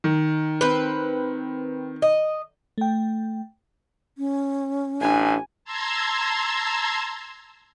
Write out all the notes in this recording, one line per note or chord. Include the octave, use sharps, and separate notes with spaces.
D#3
C4 B4
D#5
A3 G5
C#4
A1 D4 G#5
A5 A#5 C6 E6 G#6